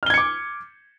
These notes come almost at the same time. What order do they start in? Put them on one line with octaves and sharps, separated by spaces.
F6 G7 G#6 C#7 D6